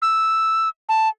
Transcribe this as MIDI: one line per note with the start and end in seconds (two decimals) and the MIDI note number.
0.02 0.69 88
0.89 1.08 81